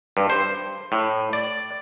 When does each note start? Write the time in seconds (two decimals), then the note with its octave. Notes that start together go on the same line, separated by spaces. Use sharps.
0.17 G2
0.30 C5
0.92 A2
1.33 D5